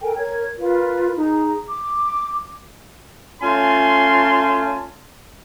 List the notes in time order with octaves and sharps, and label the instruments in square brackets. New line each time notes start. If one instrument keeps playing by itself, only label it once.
[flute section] A4 A#4 G5 G#5
A#4 C#5 G#6
F4 A#4 B4
D#4 G#4 A#5
D6
[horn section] A3 C#4 F4 G#5 A5 C6